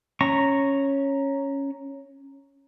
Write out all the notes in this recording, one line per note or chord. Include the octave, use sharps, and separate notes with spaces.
C#4 A#5 C#6